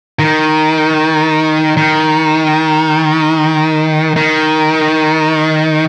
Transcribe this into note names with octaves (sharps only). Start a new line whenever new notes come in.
D#3
D#3
D#3